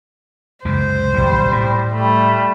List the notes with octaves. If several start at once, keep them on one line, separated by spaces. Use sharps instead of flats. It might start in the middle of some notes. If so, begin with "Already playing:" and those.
C#2 F#2 C3 C5
D#1 B1 G3
A2
G3 A3